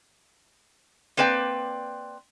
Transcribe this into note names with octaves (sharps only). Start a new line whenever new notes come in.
A#3 C4 B4 D5 G5